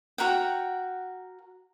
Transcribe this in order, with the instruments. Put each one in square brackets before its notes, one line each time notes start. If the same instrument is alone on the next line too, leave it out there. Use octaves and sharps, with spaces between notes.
[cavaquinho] F#4 A#4 F#5 G5